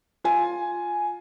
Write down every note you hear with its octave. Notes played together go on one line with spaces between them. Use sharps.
F4 G#5